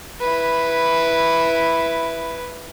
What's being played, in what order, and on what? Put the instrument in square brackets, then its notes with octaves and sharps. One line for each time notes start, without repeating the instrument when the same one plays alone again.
[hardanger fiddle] E4 B4